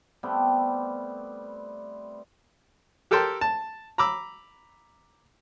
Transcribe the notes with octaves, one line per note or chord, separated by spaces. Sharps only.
G3 A3 B3 C4
G4 A4 A#4 G5 A5 C6
A5
A#5 B5 D6 E6